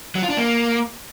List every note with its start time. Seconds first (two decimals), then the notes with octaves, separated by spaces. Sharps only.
0.15 F#3
0.23 F4
0.30 D4
0.37 A#3